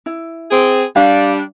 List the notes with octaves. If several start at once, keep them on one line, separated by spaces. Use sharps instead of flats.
E4
C4 G#4
G3 D4 F5